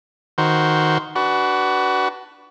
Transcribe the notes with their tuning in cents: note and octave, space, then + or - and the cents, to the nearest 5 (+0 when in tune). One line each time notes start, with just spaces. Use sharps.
D#3 +0 F#4 +0 C5 -5
D4 +0 F#4 +25 B4 -5